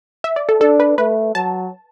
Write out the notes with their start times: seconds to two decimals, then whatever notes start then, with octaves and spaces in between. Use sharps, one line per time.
0.24 E5
0.36 D5
0.49 A4
0.61 D4 A4
0.80 B4
0.98 A3 B4
1.35 F#3 A5